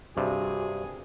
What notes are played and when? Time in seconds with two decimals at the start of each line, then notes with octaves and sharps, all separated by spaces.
0.17 G2 C3 F#4 G#4